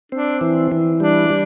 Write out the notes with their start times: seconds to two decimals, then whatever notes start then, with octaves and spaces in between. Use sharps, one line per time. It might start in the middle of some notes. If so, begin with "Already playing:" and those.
0.12 C4 D4
0.41 E3
0.72 E3
1.00 G3 D4
1.30 G3